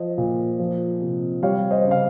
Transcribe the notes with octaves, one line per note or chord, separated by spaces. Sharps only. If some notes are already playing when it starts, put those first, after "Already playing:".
Already playing: F3 C5 D#5
A#2
F3
C3
G3 C#5 F5
C5 D#5
C#3
F5